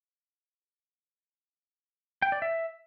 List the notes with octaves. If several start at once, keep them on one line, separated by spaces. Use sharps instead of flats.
G5
D5
E5